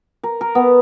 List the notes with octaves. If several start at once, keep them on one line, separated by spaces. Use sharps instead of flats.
A#4
A#4
B3